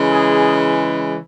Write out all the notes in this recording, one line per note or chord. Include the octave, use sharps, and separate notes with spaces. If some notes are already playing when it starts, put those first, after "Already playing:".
Already playing: C#3 E3 G#3
G#4